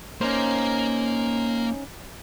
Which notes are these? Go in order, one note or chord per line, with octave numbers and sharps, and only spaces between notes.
A#3 C#4 D#4 C5